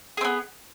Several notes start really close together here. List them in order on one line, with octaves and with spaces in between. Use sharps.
G#4 C4 B3